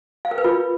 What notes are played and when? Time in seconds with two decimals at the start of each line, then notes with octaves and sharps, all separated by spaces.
0.25 F5
0.31 A#4
0.38 B4
0.44 F4